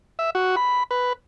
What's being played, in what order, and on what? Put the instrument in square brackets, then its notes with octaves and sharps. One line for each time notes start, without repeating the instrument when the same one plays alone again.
[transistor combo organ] E5
F#4
B5
B4